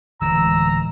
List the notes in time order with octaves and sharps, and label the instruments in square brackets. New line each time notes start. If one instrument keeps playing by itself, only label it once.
[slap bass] D1 E3 G#3 [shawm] A#5 [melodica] E6